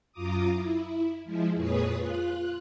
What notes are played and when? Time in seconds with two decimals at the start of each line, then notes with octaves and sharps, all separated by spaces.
0.12 F#2 F4 A#5 D6 D#6
0.53 E4
1.24 F3 G#3 E4
1.55 F2 A#2 G#4 B4 C#5 D#6
1.94 F4 F#6